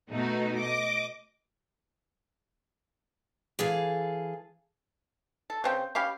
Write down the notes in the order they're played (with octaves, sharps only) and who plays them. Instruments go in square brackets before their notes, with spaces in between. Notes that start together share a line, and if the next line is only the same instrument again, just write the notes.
[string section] B2 A3 D#4 F#4
D#5 D6
[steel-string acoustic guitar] E3 G#4 A4 F5
[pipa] A4
C#3 C4 G5
C#4 G4 F5 B5